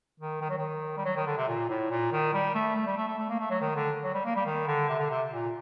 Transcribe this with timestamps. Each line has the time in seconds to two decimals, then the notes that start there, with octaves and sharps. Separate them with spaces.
0.20 D#3
0.41 D#3
0.50 F#3
0.58 D#3
0.98 G3
1.05 F#3
1.16 D#3
1.27 D3
1.37 C3
1.48 A#2
1.69 A2
1.91 A#2
2.12 D#3
2.33 G3
2.55 A3
2.76 A3
2.87 G3
2.97 A3
3.08 A3
3.18 A3
3.29 A#3
3.40 A3
3.50 F#3
3.61 D#3
3.75 D3
4.04 F#3
4.14 G3
4.25 A#3
4.36 G3
4.46 D#3
4.67 D3
4.89 C3
4.99 D3
5.10 C3
5.32 A#2